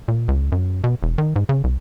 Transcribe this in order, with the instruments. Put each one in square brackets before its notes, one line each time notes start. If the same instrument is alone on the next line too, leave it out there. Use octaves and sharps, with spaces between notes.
[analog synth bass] A#2
C#2
F#2
B2
E1
D#3
G#2
C#3
C2